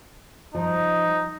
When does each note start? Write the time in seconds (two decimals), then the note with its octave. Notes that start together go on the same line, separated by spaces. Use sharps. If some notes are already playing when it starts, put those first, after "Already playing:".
0.55 F3 D#4